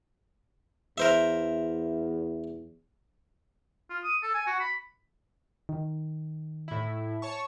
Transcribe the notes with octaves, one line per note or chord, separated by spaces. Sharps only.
E2 A#4 C5 E5
F4
D#6
A4
G#5
F#4
B5
D#3
A2 E4
C#5 A5 C#6